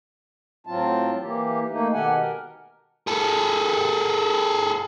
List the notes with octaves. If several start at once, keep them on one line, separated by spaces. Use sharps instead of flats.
A2 F#3 C4 F4 A5
E3 A#3 G4
A3 A#3 D#4
B2 D#3 G4 A4 F#5 G#5
A#4
G#4 A4